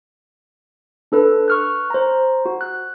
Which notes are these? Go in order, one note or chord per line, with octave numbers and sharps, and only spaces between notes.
D4 A4 B4
C#6 F6 F#6
C5 A#5
F#4
F#6